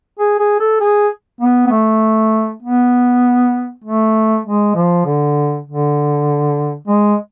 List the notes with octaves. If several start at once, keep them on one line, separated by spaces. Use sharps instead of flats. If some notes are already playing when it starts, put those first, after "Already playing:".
G#4
G#4
A4
G#4
B3
B3
A3
B3
A3
G#3
F3
D3
D3
G#3